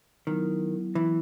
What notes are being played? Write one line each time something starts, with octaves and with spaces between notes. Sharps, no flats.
D#3 F#3 B3 E4
E3